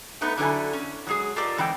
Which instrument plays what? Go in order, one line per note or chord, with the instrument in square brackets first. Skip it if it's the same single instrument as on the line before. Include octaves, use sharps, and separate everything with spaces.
[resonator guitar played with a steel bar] A3 B3 D#4 B4
D3 F#3 E4 A4 G#5
C#4
F#3 G#3 G#4
F4 G4 A4 A#4 D5 D#5
G#2 E3 C4 G4 G5